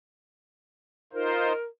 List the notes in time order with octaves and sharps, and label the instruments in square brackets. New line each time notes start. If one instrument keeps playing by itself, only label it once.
[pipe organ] D#4 F4 C5 [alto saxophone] A#4